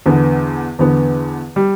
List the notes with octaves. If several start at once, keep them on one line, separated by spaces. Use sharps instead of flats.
E2 D3 B3
E2 D3 B3
G3